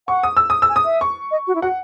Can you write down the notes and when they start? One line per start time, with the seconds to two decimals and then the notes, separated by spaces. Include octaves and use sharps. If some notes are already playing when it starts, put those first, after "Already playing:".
0.08 F#5 C#6
0.23 D#6
0.37 E6
0.50 D#6
0.62 E6
0.69 G#5
0.76 D#6
0.85 E5
1.01 C#6
1.31 D#5
1.47 F#4
1.55 E4
1.62 F#4 F#5